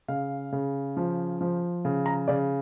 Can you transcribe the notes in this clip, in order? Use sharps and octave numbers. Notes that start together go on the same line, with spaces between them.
C#3 F5
C#3
F3
F3
C#3
A#5
C#3 D5